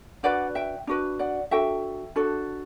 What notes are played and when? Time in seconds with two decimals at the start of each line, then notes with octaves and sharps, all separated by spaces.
0.23 D4 F#4 B4 D5 F#5
0.55 E5 G5
0.87 D4 F#4 B4
1.19 D5 F#5
1.51 D4 F#4 A4 E5 G5
2.16 D4 F#4 A4